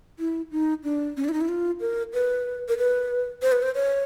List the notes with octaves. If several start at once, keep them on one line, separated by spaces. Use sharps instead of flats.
E4
D#4
D4
C#4
D4
E4
D#4
E4
F4
A#4
B4
A#4
B4
C5
B4
C5
C#5